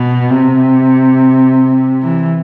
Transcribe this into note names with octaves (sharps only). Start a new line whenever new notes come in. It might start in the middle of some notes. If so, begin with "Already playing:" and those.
Already playing: B2
C3
E3